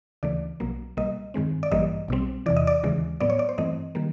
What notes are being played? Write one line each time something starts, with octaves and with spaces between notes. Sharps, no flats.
D2 C#3 E3 A3 D5
B1 B2 F#3 A#3
C2 B2 G3 A#3 D#5
G2 D#3 G#3 C4
D5
A1 G2 E3 G3 A#3 D#5
B1 B2 G3 C4
E2 C3 E3 D5
D#5
D5
D#2 C#3 E3 G#3
A2 F#3 B3 D5
C#5
D5
C5
G2 E3 A3 C4 D#5
D#3 G3 A#3